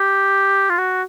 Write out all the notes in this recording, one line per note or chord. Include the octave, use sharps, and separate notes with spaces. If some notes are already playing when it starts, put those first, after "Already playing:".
Already playing: G4
F4
F#4